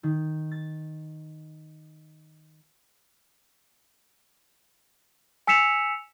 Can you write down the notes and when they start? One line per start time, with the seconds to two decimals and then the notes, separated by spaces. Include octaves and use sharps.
0.03 D#3
0.51 A6
5.47 G#5 E6 B6 C#7 E7 F7